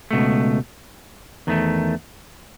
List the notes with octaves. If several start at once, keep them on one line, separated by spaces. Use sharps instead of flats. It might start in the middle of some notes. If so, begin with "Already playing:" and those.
C#2 B2 A3
E2 D#3 A3